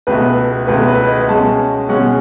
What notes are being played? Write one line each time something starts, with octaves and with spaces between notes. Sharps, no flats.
C#2 B2 A3 B4
C#2 B2 A3 B4
B4
D#5
B2 G#3 C#4 A5
B2 G#3 C#4 F#5